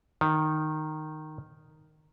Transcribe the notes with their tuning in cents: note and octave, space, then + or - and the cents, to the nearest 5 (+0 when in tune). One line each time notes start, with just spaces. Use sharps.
D#3 -5